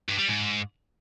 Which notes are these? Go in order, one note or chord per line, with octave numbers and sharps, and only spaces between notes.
G2
G3
G#2